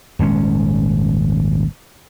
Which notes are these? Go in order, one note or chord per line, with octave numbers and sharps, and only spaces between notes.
D#1 G#1 G#3 C#4